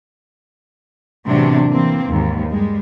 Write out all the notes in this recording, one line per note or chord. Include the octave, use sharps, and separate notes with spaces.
E2 A2 C3 F#3 D4
E3 A#3 C4
D#2 G#2
G2 G3 G#3